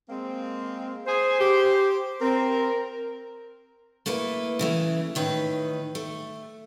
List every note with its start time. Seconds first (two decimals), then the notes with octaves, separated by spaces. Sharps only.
0.08 G#3 A#3 C4
1.06 G#4 C5
1.39 G4
2.21 C4 A#4
4.06 A3 A#3 E4 B4
4.59 C#3 E3 A3
5.15 A2 D#3 B4
5.95 A3